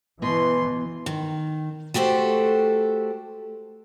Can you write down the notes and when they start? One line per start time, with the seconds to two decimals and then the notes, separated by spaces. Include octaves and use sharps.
0.22 B2 E3 C6
1.06 D#3
1.94 A3 F#4 G4 A4 C5